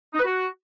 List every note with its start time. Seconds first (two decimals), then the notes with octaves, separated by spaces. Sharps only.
0.13 D#4
0.19 B4
0.25 F#4